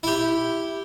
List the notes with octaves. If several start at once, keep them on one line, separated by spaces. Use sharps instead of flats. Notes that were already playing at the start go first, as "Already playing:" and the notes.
E4 G4